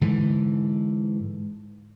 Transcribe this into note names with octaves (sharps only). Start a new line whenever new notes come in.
G#2 D3 E3